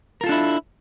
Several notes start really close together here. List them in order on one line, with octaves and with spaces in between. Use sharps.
A#4 F4 A4 D4 E4